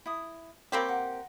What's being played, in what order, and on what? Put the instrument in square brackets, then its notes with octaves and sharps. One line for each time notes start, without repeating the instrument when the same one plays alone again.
[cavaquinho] E4 D#6
[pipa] A#3 C4 G4 [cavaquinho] C#5 B5 C#6
[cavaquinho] A#4 F#5